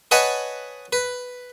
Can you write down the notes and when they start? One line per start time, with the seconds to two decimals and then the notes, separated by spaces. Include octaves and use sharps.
0.11 B4 C#5 D#5 F#5 G#5 A5
0.93 B4